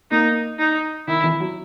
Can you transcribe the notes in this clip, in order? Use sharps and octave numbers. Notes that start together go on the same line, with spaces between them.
A#3 D#4
D#4
D#3 E4
E3
F#3